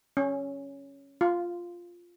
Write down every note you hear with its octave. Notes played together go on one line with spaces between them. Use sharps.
C#4
F4